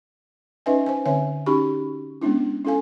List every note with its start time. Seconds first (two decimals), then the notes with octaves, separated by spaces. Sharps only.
0.66 C#4 D#4 B4 D#5 E5 G#5
0.86 C5 G#5
1.06 D3 C4 C#5 E5 G#5
1.46 C#4 D#4 F#4 G4 B5 C#6
2.21 G#3 B3 C#4 D4 E4
2.65 C#4 E4 A4 F5 G#5